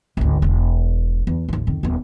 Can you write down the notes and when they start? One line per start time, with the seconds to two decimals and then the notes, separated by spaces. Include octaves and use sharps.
0.17 G#1 D2
0.42 E1
1.27 E2
1.49 A1 D#2
1.67 F2 D#3
1.83 D#1 B3